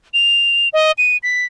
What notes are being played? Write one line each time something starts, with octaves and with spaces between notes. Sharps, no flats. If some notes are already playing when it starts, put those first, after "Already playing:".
F7
D#5
D#7
B6